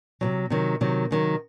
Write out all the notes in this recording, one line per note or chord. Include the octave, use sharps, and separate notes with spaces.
C3 D#3 F#3
C3 D#3 F#3
C3 D#3 F#3
C3 D#3 F#3